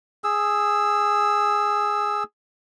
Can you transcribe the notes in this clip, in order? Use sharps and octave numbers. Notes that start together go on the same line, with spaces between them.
G#4 E6